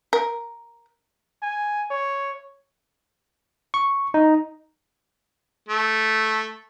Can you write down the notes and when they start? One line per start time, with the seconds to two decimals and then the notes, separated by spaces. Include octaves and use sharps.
0.13 A#4
1.42 G#5
1.91 C#5
3.74 C#6
4.14 D#4
5.69 A3